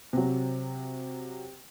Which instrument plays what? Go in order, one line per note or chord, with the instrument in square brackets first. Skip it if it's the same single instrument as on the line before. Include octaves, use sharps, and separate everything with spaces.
[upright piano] C3 F#3